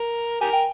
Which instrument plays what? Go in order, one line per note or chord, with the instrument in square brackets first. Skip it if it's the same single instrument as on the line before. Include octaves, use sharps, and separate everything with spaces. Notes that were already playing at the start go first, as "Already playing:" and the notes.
Already playing: [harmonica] A#4
[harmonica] G4 A#4 [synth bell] G#5
[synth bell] G5